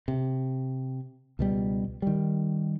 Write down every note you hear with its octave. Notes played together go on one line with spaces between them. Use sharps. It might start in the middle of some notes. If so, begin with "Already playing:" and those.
C3
C#2 B2 G3
D#3 G3